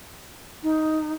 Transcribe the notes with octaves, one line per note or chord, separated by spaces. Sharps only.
D#4